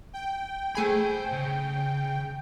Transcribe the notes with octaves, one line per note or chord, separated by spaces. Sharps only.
G5
A3 G#4 C5 G#5 B5
C#3